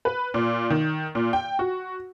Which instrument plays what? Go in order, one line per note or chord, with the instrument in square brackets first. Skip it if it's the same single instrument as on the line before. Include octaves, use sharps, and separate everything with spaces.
[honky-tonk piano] B4
A#2
D#3
A#2
G5
F#4